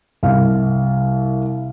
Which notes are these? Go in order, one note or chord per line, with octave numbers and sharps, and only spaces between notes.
C2 F5